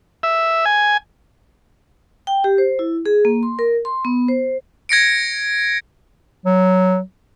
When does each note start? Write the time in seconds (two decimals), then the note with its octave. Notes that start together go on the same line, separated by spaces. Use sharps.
0.23 E5
0.66 G#5
2.27 G5
2.44 G4
2.58 C5
2.79 E4
3.06 G#4
3.25 A#3
3.43 C6
3.59 A#4
3.85 C6
4.05 B3
4.28 C5
4.89 G#6 A#6 C#7 D7
6.46 F#3